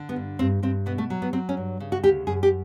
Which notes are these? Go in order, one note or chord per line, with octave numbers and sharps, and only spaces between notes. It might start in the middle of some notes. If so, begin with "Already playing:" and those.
Already playing: D3
B3
G2
G2 C4
G2 C4
B2 B3
A3
F#3
B3
F#3 C4
C#4
G2
C#3
F#4
D2 G4
F#2 G#4
G4